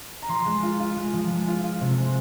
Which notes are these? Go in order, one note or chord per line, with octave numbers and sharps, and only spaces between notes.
A#5
F3 C6
G#3
F4
F4
G#3
F3
G#3
F4
F4
C3
G#3